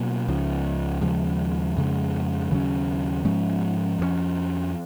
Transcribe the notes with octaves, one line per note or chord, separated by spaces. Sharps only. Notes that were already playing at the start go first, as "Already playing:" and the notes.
Already playing: B2 F#3 A#3
C#2 C#3 F3
D#2 C#3 F3 G#3
F2 C#3 G#3
D#2 C#3 F#3 C#4
G#2 F3 G#3 C#4
F2 F3 G#3 C#4